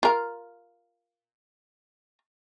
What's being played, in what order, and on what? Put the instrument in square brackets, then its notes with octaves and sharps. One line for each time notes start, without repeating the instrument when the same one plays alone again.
[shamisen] F4 A#4